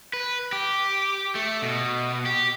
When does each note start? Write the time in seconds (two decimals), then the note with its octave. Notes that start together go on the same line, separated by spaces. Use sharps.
0.13 B4
0.53 G4
1.35 A3
1.62 B2
2.26 G4